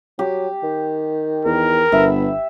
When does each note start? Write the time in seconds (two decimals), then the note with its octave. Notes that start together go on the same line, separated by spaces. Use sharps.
0.19 F#3 G4
0.63 D#3
1.45 E2 A#4
1.92 G1 B3 E5